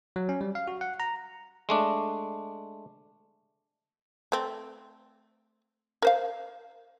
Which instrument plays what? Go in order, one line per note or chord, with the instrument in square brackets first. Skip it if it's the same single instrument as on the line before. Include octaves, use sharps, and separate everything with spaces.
[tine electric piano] F#3
C#4
G3
F5
F#4
F#5
A#5
[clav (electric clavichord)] G#3 A3 D4
[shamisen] A3 C4
A#4 C5 F5